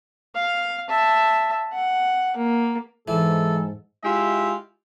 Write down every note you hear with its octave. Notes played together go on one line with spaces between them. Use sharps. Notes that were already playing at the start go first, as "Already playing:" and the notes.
F5
E5 A5
F#5
A#3
G#2 E3 A4
G#3 E4 F4 G4 E5